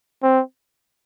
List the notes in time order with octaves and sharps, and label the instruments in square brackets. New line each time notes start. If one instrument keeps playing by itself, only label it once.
[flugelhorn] C4